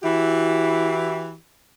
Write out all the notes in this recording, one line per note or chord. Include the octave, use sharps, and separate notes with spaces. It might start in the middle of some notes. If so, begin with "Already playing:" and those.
E3 E4 F#4 G4